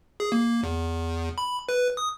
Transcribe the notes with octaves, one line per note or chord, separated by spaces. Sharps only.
G#4
A#3
E2
B5
B4
D#6